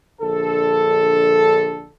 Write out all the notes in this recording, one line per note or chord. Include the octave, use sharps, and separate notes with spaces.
A#1 D3 A4